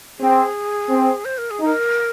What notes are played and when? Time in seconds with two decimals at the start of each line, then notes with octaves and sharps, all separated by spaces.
0.20 C4 G#4
0.89 C4
1.25 C5
1.38 A#4
1.51 G#4
1.60 D#4 A#4